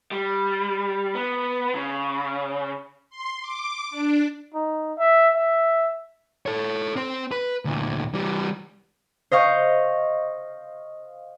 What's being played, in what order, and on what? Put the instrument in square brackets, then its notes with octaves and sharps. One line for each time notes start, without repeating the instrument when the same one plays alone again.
[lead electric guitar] G3
B3
C#3
[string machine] C6
D6
D4
[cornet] D#4
E5
E5
[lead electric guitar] A4 C#5
C4 C5
B4
D2 A#2
E3 G3
[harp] C5 D#5 F5 C#6 G6